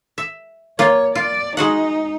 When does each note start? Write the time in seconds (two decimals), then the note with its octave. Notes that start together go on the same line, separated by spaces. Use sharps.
0.18 E5
0.79 A#3 F4 C#5
1.15 F4 D5
1.57 G#3 D#4 F#4 F#5